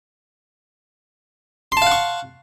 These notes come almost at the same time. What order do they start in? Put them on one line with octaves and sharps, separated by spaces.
C6 A5 F5 F#5 C#6